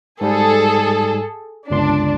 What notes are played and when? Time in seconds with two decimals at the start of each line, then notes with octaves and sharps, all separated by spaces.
0.21 G#2 G3 G#4 A4
1.70 G1 C#2 D4 C6